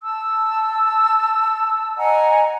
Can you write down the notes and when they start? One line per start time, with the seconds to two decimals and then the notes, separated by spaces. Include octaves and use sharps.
0.03 A5 E6
1.97 D#5 F#5 G#5 A#5